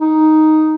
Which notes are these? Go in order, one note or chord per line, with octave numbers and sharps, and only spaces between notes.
D#4